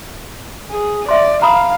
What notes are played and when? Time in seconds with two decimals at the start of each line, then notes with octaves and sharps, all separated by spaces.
0.71 G#4
1.09 D5 E5 C6
1.42 F5 A#5 B5 D#6